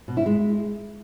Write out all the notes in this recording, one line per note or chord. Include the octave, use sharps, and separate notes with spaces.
B2
E4
G#3